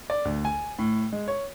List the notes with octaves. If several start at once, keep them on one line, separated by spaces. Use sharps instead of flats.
D5
D2
G#5
A2
G#3
C#5